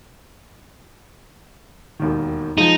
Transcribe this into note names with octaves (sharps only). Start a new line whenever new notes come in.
E1 D#2 D#3
F3 G#3 D#4